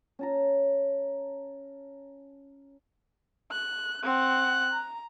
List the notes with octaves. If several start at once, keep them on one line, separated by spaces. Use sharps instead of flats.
C#4 A5 A#5
F#6
C4 F#5 F#6
A#5